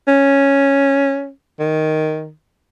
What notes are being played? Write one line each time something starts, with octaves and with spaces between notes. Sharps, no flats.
C#4
D#3